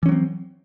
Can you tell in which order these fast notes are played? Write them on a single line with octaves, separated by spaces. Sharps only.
E3 C#4 F#3 C4